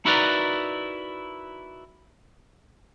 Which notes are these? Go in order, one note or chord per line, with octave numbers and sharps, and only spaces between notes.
D#4 E4 F#4 A#4 B4 D5